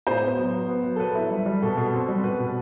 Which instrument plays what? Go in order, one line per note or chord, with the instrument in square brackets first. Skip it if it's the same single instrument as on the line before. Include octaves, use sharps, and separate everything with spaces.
[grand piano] A2 [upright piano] C5
[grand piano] B3
F#3
B3
B3
F#3
[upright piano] A4
[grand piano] F#3 [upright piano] B4
[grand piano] E4
G3
G3
[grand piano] B2 [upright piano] A4
[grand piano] B2
C4
G3
[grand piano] B2 [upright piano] B4
[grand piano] B2